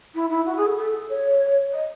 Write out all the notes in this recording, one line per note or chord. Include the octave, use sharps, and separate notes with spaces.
E4
E4
F#4
G#4
A4
A4
C#5
D#5